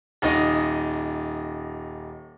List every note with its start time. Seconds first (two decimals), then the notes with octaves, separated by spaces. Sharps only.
0.22 D#1 D#4 D#5